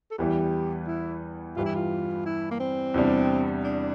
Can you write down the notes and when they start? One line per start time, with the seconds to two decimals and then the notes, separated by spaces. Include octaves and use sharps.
0.11 A4
0.18 E2 E3 G3 G4
0.87 E4
1.56 G2 E3 G3 F4
1.66 E4
1.75 F4
2.26 E4
2.51 A#3
2.60 C4
2.94 E2 C3 G3 D4
3.64 D4